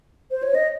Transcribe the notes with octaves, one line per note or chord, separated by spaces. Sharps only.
C5
C#5
D#5